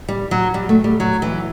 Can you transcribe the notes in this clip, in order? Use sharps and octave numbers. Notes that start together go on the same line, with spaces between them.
G3
F#3
G3
A3
G3
F#3
E3